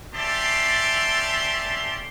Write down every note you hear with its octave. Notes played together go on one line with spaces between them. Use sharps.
C#4 G4 D5 E5 A5 C6